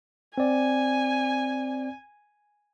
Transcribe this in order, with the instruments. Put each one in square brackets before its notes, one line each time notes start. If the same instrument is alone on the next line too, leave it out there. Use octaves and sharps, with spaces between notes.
[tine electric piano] C4 D5 [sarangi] G#5